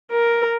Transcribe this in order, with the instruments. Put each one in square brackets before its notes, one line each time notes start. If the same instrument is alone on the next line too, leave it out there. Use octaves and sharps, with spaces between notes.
[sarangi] A#4